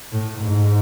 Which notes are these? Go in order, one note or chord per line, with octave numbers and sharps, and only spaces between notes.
A2
G#2